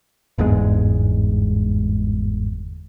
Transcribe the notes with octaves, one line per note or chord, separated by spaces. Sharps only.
G1 E2 G#2 G#3